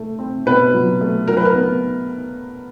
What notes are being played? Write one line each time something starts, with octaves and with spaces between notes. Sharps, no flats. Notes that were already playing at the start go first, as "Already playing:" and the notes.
Already playing: A3
C4
B2 B4
F#3
A3
F#3 A#4
B4
A#4
B3